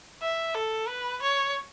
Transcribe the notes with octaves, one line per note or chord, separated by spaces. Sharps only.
E5
A4
B4
C#5